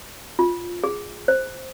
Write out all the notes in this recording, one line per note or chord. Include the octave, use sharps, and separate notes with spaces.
F4
G#4
C5